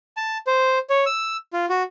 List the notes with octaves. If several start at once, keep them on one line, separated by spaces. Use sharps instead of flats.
A5
C5
C#5
E6
F4
F#4